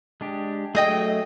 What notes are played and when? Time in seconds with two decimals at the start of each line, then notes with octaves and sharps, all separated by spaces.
0.21 G#3 D4 G4
0.75 F#3 A3 G#4 D#5 G5